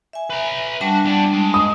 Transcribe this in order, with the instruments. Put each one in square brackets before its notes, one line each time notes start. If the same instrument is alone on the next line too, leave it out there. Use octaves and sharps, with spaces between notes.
[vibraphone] E5 G#5
[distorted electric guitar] B4 A#5
[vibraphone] G3 D4 A5 [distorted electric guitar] F#4
[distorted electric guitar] E2 D5
G#3
[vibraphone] D#5 [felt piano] D#6